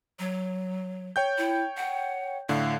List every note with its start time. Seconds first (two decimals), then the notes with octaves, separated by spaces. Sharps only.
0.19 F#3
1.16 C#5 G5 G6
1.38 E4
1.77 F#5
2.49 A2 D3 F5